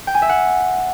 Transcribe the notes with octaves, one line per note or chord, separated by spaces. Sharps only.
G5
G#5
E5
F#5